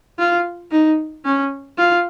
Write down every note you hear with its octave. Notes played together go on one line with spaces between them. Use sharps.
F4
D#4
C#4
F4